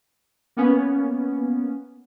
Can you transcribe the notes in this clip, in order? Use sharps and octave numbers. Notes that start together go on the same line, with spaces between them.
A#3 B3 C#4